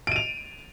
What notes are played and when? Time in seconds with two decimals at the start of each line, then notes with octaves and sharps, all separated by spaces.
0.07 D7
0.12 D#7
0.16 F7